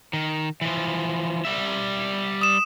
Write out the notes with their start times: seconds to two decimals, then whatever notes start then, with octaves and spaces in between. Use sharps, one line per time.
0.13 D#3
0.61 E3 F3
1.45 G3 E5
2.41 D#6 E7